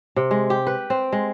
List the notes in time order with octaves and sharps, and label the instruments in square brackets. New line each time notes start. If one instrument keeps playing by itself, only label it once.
[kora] C3
G#3
G4
B4
C4
G#3